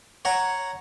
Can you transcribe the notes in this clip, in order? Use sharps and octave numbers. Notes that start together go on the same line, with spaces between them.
C#5 F#5 A#5